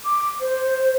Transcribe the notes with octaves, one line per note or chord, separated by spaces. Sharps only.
D6
C5